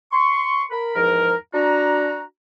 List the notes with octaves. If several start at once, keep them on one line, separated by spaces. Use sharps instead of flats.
C6 C#6
A#4 B5
E2 G#2 F3 A#4
D4 F#4 A#5